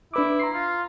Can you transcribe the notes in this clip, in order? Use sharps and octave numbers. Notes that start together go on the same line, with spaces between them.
D4 E4 B4 D6
A#5 C6 C7
F4